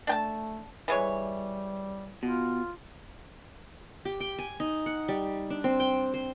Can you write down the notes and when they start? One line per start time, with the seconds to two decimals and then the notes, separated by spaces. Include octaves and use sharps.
0.07 A3 D4 G5 A5
0.88 E3 G3 G#3 C#5
2.23 B2 F4
4.05 G4
4.20 G5
4.39 G#5
4.60 D#4
4.86 F#5
5.08 G3
5.50 D4
5.64 C4
5.80 G5
6.14 C5